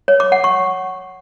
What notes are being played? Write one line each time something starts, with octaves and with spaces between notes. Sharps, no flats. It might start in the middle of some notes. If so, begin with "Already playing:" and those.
C#5
D6
F#5
C#6